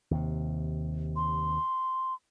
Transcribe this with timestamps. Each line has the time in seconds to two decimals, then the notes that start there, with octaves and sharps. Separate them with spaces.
0.11 D#2 C3
1.16 C6